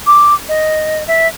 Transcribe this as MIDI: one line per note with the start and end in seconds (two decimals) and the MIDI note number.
0.07 0.35 86
0.49 1.03 75
1.08 1.27 76